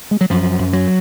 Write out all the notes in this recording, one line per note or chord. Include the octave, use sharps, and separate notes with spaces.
G#3
F#3
F#2 F3
F#2
F#3